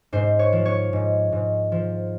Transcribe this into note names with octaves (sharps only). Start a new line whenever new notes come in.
G#2 C5
C#5
F3
C#5
G#2
G#2
F3